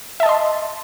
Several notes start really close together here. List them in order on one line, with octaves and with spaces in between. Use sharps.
E5 A5 D#5 C6